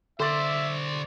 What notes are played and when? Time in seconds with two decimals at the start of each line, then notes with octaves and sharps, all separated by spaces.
0.20 D3 C5 D5 E5 C6 D6 A6